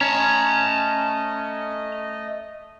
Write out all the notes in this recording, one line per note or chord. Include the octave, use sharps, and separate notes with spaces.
A3 C#4 D#5 A5 A#5